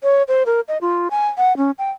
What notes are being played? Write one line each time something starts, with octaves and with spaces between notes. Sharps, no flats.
C#5
C5
A#4
D#5
F4
G#5
F#5
C#4
G5